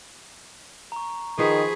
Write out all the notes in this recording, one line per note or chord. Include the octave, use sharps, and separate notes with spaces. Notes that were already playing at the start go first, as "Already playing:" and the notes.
A#5 C#6
D#3 F3 D#4 G#4 B4 C#6 B6